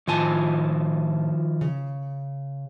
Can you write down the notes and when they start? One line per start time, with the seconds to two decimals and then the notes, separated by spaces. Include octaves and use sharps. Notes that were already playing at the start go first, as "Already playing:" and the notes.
0.07 A2 D#3 F3 F4 G#5 A5
1.61 C#3